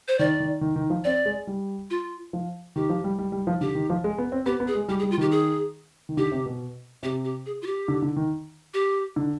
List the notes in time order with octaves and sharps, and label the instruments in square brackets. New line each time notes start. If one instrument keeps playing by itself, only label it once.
[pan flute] C5
[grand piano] D#3 [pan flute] D5
[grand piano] D#3
D#3
D#3
F3
[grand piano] C4 [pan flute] D5
[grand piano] G#3
G3
[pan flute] F4
[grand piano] F3
[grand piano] D#3 [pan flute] G4
[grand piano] F3
G3
G3
G3
F3
[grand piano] D3 [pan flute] G4
[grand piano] D#3
F3
G#3
B3
C4
[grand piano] B3 [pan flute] G4
[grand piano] B3
[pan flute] G#4
[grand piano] G#3
[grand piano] G3 [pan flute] G4
[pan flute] G#4
[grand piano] G3
[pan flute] F4
[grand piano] D#3 [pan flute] G4
[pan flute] G#4
[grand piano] D#3
[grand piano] D3 [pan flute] G4
[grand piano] C3
B2
[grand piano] C3 [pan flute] G4
[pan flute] G4
G#4
F4
G4
[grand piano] D3
D3
D#3
[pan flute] G4
[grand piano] D3